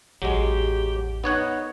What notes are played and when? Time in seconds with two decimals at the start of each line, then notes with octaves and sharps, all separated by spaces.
0.22 A1 E2 F#3 G#3 G4
1.24 B3 D#4 C#5 F#5